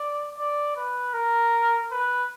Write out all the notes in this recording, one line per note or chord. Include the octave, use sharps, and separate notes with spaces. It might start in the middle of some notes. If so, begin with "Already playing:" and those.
Already playing: D5
D5
B4
A#4
B4